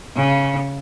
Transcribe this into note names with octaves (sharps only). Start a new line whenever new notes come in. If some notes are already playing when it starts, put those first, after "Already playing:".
C#3